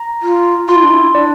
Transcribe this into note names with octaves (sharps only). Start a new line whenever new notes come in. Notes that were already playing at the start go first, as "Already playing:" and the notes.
Already playing: A#5
F4
F4 C6
E4
D4
E4
D4 D5